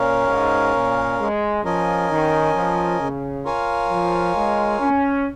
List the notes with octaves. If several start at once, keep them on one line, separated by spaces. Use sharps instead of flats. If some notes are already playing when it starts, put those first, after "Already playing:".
Already playing: A#2 C#4 A#4 C#5 F5
G#2
A#2
G#3
F3 C#4 A#4 D#5 G#5
D#3
F3
C#3
F4 A#4 C#5 F5 G#5
F3
G#3
C#4